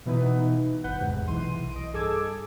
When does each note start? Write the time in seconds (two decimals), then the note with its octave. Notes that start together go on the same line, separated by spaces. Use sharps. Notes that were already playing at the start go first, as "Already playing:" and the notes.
0.06 B2 E3 B3 D#4 E4 B4
0.84 G1 B4 F#5 G6
1.00 E2 G#2 C3
1.27 B1 E3 C6 D#7
1.71 D#5 D7
1.93 G2 G#4 A4 D6 E6 G#6